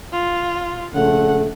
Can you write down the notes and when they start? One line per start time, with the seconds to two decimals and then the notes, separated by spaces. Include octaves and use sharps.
0.13 F4
0.94 A#1 C#3 A3 F#5